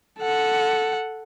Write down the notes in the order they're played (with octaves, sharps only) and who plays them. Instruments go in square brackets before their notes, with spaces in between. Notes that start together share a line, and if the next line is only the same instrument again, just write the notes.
[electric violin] A4 F#5